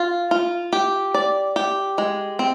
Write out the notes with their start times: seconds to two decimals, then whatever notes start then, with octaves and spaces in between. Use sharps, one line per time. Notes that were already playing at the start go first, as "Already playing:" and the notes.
Already playing: F4
0.31 F4
0.73 G4
1.14 D5
1.56 G4
1.98 G#3
2.39 C4